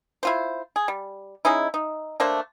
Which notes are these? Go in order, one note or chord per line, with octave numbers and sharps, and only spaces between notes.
E4 F4 C5
G#4
G3
G#3 C#4 D#4 E4
D#4
A3 A#3 D4 C5